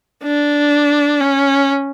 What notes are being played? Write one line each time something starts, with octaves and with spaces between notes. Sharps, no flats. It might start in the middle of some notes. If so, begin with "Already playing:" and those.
D4
C#4